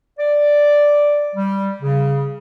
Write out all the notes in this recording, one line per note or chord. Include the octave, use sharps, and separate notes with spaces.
D5
G3
C#3